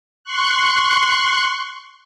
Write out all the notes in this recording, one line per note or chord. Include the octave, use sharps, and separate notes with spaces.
C6 C#6 F#6